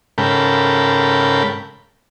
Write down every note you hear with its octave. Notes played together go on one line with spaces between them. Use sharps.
G#2 C#3 A4 A#4 G5 B5